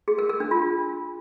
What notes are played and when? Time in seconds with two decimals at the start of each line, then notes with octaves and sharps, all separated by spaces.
0.08 G#4
0.19 A#4
0.29 A#4
0.40 D4
0.51 F4